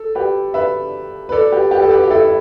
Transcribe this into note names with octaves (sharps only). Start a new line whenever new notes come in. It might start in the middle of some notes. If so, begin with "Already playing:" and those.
Already playing: A4
G4 B4
B4 E5
B4
A4 D5
G4 B4
G4 B4
A4
G4 B4
G4
E4 A4
E4